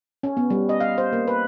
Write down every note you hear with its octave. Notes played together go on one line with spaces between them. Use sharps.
C#4
B3
G3
D#5
F5
C5
A#3
B4